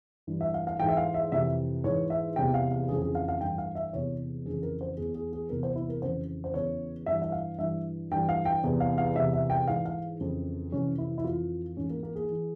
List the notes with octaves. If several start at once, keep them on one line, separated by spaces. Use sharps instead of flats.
G2 E3
E5
F5
F5
G#2 E3 G5
E5
F5
E5
F2 C3 E3 E5
G#2 E3 C#5
E5
E2 C3 E3 G5
F5
F5
F2 C#3 E3 G#4
G#4
F5
F5
G2 E3 G5
F5
E5
E2 C3 E3 C#5
F2 C#3 E3 G#4
A#4
C5
E2 E3 G#4
G#4
G#4
E2 C3 E3 A#4
C5
E4
A#4
F2 C#3 E3 C5
C5
E2 C#3 E3 C#5
G2 E3 E5
E5
F5
G2 E3 E5
G2 E3 G5
F5
G5
E2 C3 E3
F5
F5
E2 C3 E3 E5
E5
G5
G#2 E3 F5
F5
F2 C#3 E3
F2 C3 E3 C#4
E4
E4
F2 E3 F4
G#2 E3 C#4
A#3
A#3
G#4
E3